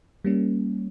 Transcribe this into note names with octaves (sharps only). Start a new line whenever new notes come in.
G3 A#3 C#4